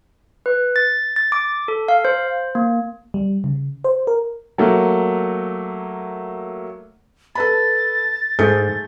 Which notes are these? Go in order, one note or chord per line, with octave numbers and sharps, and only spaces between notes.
B4
A6
A6
D6
A4
F5
C5
A#3
G3
C#3
C5
A#4
F#3 A3 A#3
A4 B4 B5 A6
G#2 G#3 A3 A4 G6